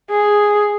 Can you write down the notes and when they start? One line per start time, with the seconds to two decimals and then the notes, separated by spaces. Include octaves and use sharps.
0.10 G#4